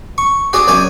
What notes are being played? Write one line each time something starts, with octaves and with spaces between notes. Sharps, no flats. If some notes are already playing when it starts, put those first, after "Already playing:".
C#6
F#4 G#4 D5
F#2 D5 G#5